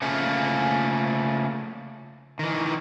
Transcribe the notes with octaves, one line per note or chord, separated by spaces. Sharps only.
C#3 F3 A3 A#3 C#4
D#3 E3